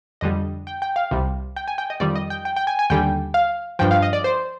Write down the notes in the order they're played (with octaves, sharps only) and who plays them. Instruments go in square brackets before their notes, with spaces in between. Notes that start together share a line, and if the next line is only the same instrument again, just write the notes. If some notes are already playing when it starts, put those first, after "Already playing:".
[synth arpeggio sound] F2 D3 G3 D#5
G5
G5
F5
C2 C3 G3
G5
G#5
G5
D#5
F2 D#3 G3 D5
D#5
G5
G5
G5
G#5
G#5
D#2 D3 G3 G5
F5
G2 F3 G5
F5
D#5
D5
C5